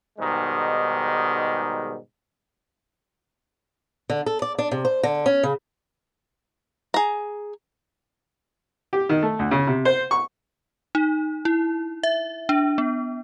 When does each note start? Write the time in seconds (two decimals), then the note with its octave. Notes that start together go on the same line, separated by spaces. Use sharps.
0.19 G#2 B2 D#3 G3 G#3
4.10 D3
4.26 A4
4.42 D5
4.59 D4
4.71 C3
4.85 C5
5.03 D3
5.26 C#4
5.43 C#3
6.94 G#4 A#5
8.93 G4
9.09 D#3
9.22 A3
9.39 D2
9.51 C#3
9.67 C3
9.85 C5
10.11 C#6
10.95 D#4
11.45 E4
12.03 E5
12.49 D4
12.78 B3